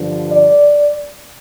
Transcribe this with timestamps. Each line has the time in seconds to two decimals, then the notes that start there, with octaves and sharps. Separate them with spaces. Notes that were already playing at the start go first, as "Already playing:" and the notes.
Already playing: G2 D3 F3
0.32 D5